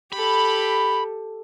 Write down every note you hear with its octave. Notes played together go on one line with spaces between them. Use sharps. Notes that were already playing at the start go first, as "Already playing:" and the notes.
G4 A4 B5